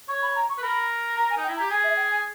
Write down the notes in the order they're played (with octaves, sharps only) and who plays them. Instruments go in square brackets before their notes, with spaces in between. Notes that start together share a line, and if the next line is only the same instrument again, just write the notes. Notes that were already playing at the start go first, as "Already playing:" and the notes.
[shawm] C#5 [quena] C#6
[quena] B5
A#5
C#6
[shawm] B4
[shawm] A#4 [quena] B5
[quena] A#5
G#5
[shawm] D#4
[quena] G5
[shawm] E4
[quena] A#5
[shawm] G4
[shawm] G#4 [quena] G#5
[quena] E5
G5
G#5